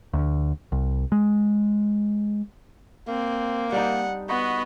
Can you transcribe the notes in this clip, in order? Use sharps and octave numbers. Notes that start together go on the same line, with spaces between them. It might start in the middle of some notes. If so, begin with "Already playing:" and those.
D2
C2
G#3
A#3 C4
G3 D4 D#4 F#5
B3 F#4 D#5 B5